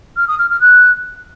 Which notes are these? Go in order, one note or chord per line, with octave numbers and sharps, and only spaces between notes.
F6
D#6
F6
F6
F#6